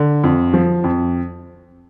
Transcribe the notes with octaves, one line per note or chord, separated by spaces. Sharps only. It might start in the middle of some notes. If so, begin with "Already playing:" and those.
Already playing: D3
F2
F3
F2